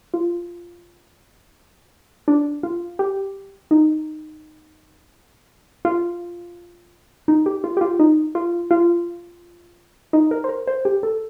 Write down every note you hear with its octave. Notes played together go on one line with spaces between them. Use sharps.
F4
D4
F4
G4
D#4
F4
D#4
G4
F4
G4
F4
D#4
F4
F4
D#4
A#4
C5
A#4
C5
G4
A4